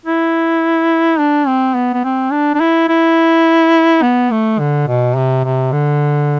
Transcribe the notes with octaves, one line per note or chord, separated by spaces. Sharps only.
E4
D4
C4
B3
B3
C4
D4
D4
E4
E4
B3
A3
D3
B2
C3
C3
D3